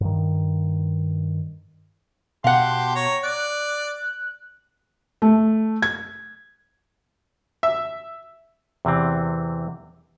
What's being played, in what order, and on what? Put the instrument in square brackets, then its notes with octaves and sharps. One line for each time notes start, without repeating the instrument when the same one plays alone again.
[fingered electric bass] G2 D#3
[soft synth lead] B2 [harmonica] G4 A5 C6 [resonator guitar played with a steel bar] F5 F#5
[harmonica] C#5 A#5
[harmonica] D5 [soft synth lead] F#6
[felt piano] A3
G#6
[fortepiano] E5
[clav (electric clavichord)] E2 C3 E3 C4